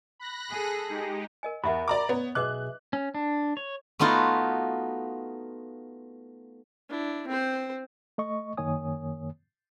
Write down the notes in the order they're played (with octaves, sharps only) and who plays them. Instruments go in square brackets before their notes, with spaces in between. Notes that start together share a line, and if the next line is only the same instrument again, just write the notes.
[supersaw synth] B5 F#6 A#6
[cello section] G#4 A4
[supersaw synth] G#3 D#4 G4
[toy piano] A#4 D#5 G#5
[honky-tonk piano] E2 [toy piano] G4 E5 F#5 [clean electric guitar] A#4 B5
[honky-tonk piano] D5 A#5 D6 [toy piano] C6
[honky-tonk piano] B3 [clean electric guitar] C#5
[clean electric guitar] B1 G#4 E5 [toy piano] B4 D#5 D6 [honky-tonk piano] F#6
[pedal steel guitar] C#4
D4
C#5
[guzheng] A3 B3 D#4 F4 F#4
[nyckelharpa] D4 E4
C4 C5
[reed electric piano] A3 D#5 C#6
F#2 D#3 A#3 C#5 G#5 D#6